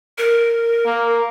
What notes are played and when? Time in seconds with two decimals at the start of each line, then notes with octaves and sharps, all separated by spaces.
0.18 A#4
0.86 A#3